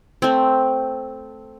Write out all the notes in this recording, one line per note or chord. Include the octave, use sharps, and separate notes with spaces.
A3 C4